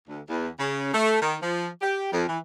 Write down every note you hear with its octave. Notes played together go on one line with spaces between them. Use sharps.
D2
E2
C#3
A3
D#3
F3
G4
F2
E3